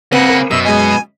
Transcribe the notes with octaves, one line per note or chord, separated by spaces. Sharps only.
C#3 A#3 C4 B4 F#5
A#4
F#2 B2 E6
G#3 D#5 G#5